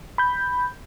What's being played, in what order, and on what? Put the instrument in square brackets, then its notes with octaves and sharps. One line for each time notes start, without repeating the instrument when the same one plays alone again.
[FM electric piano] B5 G6